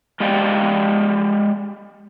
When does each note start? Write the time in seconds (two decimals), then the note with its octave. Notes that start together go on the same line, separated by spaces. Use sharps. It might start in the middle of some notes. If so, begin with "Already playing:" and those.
0.20 G#3 G4 D5 F5 G5